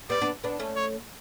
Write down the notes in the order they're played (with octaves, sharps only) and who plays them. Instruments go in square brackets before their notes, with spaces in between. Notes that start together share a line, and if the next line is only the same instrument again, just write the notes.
[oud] G3 B3 [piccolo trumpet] D5
[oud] B3 D4
B3 D4
A3 C#4
[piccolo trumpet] C#5